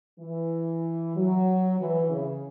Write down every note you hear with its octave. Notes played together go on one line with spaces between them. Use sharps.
E3
F#3
E3
C#3